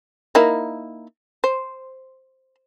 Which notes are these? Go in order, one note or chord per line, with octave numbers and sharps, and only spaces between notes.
A#3 D#4 E4
C5